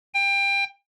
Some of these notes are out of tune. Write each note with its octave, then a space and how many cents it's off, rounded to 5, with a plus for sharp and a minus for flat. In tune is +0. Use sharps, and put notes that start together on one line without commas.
G5 +25